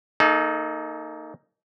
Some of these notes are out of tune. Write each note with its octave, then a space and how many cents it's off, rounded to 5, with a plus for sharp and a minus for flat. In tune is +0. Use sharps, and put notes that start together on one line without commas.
A#3 -30 D#4 +0 A4 -40